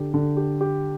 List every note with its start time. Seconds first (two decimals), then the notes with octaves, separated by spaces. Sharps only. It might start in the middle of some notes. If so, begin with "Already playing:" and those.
Already playing: D3 G4
0.14 D3
0.37 G4
0.61 G4